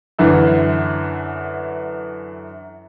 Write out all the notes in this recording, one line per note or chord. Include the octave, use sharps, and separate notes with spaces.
F#2 D3 E3